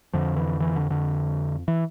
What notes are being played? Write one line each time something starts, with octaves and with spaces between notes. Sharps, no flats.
F2 D3 F3
E3
E3
D3
D3
E3